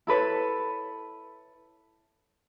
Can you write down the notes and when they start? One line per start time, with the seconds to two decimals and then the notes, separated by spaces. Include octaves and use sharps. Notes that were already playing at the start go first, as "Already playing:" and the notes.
0.07 E4 A4 B4 C#5